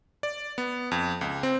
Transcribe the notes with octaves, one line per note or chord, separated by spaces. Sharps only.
D5
B3
F2
C#2
C4